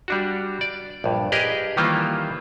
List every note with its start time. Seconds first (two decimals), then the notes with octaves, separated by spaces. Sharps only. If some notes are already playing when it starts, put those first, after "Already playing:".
0.08 G3 D4 F#4
0.61 D5
1.04 A#1 G2
1.32 G4 G#4 A#4 B4 D5 D#5
1.77 D#3 E3 G3 A#3 F4 C5